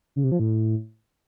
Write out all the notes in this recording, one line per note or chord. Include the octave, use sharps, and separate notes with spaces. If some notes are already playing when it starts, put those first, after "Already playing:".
C#3
C3
F3
A2